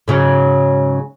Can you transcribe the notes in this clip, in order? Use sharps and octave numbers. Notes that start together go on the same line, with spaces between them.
G#2 C#3 F#3